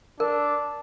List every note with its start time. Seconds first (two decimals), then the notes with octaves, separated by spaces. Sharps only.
0.20 D4 A#4